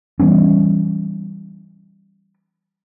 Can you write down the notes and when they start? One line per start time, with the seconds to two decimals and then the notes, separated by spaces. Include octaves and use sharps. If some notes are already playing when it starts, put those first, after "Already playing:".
0.19 E3 G3 B3 C#4